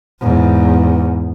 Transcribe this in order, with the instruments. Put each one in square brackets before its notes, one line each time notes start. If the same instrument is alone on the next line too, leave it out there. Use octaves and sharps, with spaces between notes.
[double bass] E2 G#2